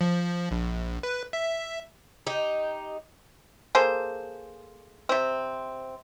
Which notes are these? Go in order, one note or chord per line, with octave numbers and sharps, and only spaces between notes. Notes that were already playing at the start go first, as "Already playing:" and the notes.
F3
A#1
B4
E5
D#4 G4
A#3 G#4 A4 C5
C3 C4